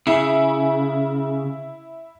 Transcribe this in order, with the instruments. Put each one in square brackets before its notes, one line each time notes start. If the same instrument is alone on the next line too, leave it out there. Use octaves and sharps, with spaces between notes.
[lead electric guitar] C#3 [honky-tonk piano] E4